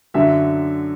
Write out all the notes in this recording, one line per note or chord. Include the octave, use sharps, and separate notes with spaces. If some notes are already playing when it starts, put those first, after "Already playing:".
F#2 D3 F#3 E5